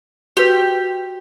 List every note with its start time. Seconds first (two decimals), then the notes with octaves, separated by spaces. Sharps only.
0.37 F#4 G4 B4